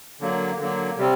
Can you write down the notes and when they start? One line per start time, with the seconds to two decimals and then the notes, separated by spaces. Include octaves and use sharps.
0.21 D3 F#3 A#3
0.60 D3 F#3 A#3
0.98 C3 G3 C4